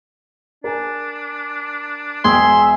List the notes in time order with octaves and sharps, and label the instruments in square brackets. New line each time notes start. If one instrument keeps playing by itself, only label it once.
[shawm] D4 [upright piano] A#4 G#5
[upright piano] E1 [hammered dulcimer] G#4 [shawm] E5 [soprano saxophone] C6